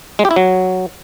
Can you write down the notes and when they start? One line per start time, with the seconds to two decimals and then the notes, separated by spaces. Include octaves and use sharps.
0.19 G#3
0.25 G4
0.31 E4
0.36 F#3